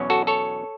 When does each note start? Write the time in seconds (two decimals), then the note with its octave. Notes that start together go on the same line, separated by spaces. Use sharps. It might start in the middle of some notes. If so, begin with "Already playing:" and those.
Already playing: E2 B2 F#3 C#4
0.10 F#4 A4
0.27 A4 C#5